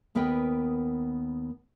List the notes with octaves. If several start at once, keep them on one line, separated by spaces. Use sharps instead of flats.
D#2 B3 A#4 B4 D#5 G5